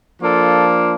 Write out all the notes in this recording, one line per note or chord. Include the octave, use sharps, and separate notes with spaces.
F3 A#3 D4 F4 A4